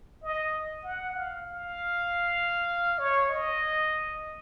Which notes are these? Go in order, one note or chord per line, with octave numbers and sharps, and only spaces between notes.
D#5
F#5
F5
F5
C#5
D#5